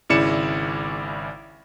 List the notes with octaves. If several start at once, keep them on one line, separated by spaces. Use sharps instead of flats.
G#1 C#3 E4 D5 C#7 E7